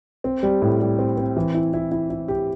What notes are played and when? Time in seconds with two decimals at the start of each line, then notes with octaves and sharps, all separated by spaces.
0.24 C4
0.43 G3
0.62 A2
0.80 G3
0.99 C4
1.18 C4
1.37 E3
1.54 E4
1.73 E4
1.92 E4
2.10 E4
2.28 G4